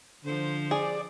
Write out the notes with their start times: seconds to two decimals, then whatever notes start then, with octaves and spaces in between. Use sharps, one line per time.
0.25 D3 F3 C5
0.71 G#4 D5